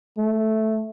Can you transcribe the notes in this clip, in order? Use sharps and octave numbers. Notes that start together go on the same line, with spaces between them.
A3